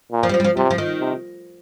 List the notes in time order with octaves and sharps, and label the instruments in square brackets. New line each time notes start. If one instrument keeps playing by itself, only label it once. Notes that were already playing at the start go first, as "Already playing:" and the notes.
[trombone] A#2
[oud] F3
G3
F3
G3
F3
[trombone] C3 [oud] G3
[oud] F3
D#3
[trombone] C3